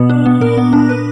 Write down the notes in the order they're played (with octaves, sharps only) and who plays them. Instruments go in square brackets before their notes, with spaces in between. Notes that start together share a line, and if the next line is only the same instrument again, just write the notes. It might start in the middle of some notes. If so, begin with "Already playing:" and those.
Already playing: [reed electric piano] B2 [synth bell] B3
[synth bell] D4
B3
[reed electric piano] A#2 [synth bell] A#4
[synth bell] B3
D4
B4